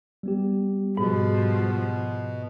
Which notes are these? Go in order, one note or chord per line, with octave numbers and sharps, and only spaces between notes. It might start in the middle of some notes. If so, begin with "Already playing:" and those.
G3 B3 G4
G#2 B2 F3